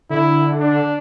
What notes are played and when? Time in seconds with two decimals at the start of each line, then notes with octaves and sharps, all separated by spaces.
0.10 D3 E4
0.60 D4